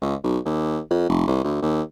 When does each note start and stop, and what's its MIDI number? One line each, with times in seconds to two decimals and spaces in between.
0.02 0.15 37
0.23 0.38 35
0.45 0.80 39
0.90 1.08 41
1.09 1.26 29
1.27 1.40 36
1.44 1.62 38
1.62 1.82 39